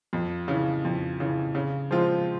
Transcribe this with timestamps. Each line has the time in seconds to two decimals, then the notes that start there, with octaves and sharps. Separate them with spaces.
0.13 F2
0.48 C#3 E3
0.85 F2
1.20 C#3 E3
1.55 C#3
1.91 F3 G#3 C4 F4